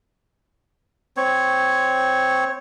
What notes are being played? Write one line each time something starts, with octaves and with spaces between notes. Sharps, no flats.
C4 C#5